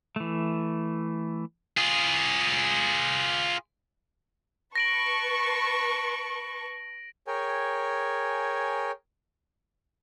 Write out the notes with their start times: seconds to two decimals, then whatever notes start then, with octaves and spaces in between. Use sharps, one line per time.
0.16 E3 A3
1.77 F4 G#4
4.76 B4 A5 C#6 A#6 D7 F#7
7.27 G#4 A#4 C#5 G5 G#5